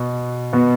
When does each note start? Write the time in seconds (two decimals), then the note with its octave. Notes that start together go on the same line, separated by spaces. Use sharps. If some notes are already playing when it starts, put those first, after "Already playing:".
Already playing: B2 B3
0.53 B2 B3